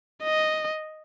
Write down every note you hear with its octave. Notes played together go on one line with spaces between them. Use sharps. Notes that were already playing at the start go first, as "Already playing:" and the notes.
D#5